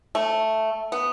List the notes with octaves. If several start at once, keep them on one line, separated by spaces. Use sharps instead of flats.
A3
B3